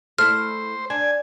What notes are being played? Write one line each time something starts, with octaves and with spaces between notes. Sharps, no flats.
A3 E4 C5 F6
D4 G#5